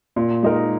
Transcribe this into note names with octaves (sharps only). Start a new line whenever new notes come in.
A#2
G#3 D#4 A#4